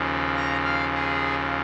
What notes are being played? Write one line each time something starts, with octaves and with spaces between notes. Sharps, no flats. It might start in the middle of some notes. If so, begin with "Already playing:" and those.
Already playing: D#2 C#3 F3
A#5
F5
G#4